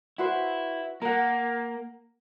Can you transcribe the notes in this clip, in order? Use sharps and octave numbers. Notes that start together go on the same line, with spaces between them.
E4 F#4 B4 C5
A#3 A#4 F#5